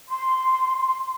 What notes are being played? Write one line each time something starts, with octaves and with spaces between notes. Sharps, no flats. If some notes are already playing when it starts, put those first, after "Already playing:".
C6